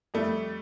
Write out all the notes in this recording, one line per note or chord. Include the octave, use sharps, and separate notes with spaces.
F2 G3 A3